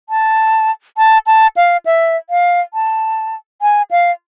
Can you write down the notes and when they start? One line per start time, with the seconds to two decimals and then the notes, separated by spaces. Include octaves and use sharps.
0.09 A5
0.98 A5
1.27 A5
1.57 F5
1.86 E5
2.30 F5
2.74 A5
3.62 G#5
3.91 F5